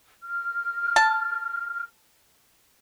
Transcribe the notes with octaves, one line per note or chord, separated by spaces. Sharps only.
F6
A5